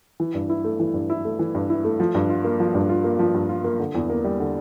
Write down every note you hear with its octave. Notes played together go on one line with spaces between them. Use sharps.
E3
G2
E4
A3
E3
G2
E4
A3
E3
G2
E4
A3
F3
G2
F4
A#3
F3
G2
F4
A#3
F3
G2
F4
A#3
D3
E2
A#3
G3
D3